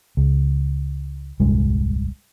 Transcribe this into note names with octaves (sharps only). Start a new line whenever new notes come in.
C#2
D#1 C2 G2 G#3